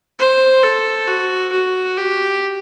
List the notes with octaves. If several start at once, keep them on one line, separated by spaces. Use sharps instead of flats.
C5
A4
F#4
F#4
G4